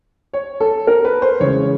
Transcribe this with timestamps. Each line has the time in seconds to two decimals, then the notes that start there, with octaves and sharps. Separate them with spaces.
0.33 C#5
0.60 A4
0.87 A#4
1.05 B4
1.22 C5
1.40 C#3 E3 G#3 C#5